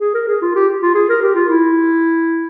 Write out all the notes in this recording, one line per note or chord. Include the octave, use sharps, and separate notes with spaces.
G#4
A#4
G#4
F4
G4
F4
G#4
A#4
G4
F4
E4